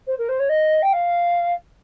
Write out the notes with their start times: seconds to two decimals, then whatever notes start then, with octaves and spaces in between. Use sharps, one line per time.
0.07 C5
0.18 A#4
0.29 C5
0.39 C#5
0.49 D#5
0.82 G5
0.93 F5